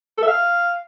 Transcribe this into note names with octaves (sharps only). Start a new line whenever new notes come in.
A4
E5
F5